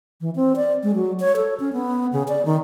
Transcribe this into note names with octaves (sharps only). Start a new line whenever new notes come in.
E3
C4
D5
G#3
F#3
C#5
A4
C#4
B3
C#3
D5
D#3